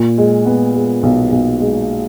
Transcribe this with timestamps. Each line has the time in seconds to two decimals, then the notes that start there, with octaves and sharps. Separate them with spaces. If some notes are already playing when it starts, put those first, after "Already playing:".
Already playing: A#2
0.18 G#3
0.46 B3
0.74 G#3
1.03 B1
1.32 B1
1.60 G#3